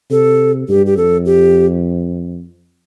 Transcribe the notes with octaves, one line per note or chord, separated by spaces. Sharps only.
C3 A4
G2 G4
G4
F2 A4
G4